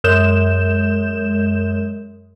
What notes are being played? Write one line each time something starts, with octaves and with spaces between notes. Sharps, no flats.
F#2 G#3 G6 E7